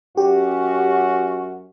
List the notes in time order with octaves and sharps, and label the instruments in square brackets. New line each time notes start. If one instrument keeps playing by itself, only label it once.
[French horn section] F#2 C#4 F#4 [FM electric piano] G4